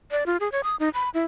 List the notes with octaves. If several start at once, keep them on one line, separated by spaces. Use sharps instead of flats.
D5
F4
G#4
C#5
D#6
D#4
B5
E4